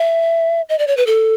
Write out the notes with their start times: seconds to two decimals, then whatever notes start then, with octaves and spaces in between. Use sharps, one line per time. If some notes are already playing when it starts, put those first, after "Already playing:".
Already playing: E5
0.69 D#5
0.79 D5
0.87 C#5
0.97 B4
1.07 A4